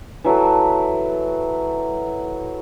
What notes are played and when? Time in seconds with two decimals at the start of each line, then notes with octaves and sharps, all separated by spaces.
0.24 E3 F#3 E4 A4